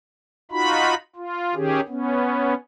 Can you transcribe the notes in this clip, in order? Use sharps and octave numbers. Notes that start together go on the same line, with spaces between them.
D#4 F4 F#4 B5
F4
D#3 C#4 G4 G#4
B3 C#4